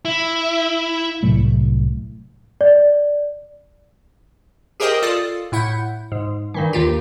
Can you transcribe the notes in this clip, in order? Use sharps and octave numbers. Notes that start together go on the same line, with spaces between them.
E4
C2 A2 F#3 A3
D5
G4 G#4 A#4 C5 D#5 G5
F4 A4 D5 D#6
A2 E4 F#5 G6
G#2
G2 D#3 E3
D#2 D#3 F4 G4